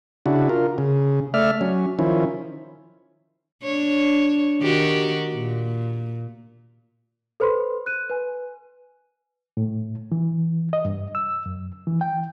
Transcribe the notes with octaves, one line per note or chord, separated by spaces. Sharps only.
C#3 D4 E4 F#4
F4 A#4
C#3
A3 D5 E5 F6
F#3 C#4
D#3 F3 C#4 E4
D4 C#5
D#3 F#4 G4
A#2
A4 B4 C5 B5 C6
F#6 D#7
B4 G#5
A2
E3
D#5
G2
E6
F#2
E3
G5